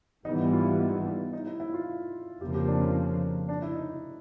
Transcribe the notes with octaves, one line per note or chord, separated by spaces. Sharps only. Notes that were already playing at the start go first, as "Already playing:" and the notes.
G#2 E3 G3 B3 D#4
E4
F4
E4
D#4
D#4
E4
E4
F4
F2 C#3 F3 A#3 G4
G4
D4
C#4
C#4
D4
E4
D#4
D#4